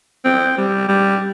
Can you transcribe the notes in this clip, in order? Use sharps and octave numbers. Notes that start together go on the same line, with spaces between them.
C4
G3
G3